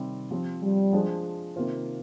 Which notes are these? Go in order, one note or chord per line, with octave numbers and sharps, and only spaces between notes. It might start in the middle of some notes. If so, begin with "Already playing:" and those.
Already playing: C3 D#3 G3 C4
F3 C4 G4
G3
F3 G#3 D4 G#4 C5
C3 D#3 A#3 F4 C5